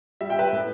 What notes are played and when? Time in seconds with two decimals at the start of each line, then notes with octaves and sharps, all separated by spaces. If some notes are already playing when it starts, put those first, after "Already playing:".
0.21 G3 E5
0.30 G5
0.39 B4 E5
0.53 A2